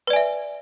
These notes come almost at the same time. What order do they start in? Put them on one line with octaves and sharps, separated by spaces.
B4 D5 G#5 E5